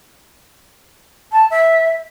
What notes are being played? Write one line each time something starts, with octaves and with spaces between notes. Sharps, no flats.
A5
E5